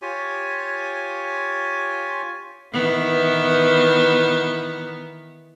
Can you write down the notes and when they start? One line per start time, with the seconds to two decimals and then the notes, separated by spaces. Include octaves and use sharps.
0.02 F4 G4 C#5 G#5
2.73 D#3 E3 B3